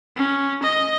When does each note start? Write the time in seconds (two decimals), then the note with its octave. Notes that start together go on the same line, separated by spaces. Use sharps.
0.16 C#4
0.63 D#5